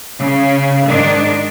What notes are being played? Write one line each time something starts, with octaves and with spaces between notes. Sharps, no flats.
C#3
G#2 D#3 D4